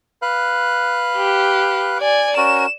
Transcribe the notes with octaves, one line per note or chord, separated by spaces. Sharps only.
B4 F5 F#6
G4
D5 G#5
C#4 F#4 A#4 E7